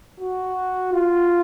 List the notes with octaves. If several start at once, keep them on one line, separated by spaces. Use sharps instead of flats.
F#4
F4